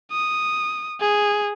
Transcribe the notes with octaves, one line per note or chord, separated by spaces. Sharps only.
D#6
G#4